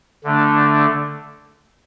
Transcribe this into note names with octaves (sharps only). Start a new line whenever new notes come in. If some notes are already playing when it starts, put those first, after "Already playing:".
D3 A3 D4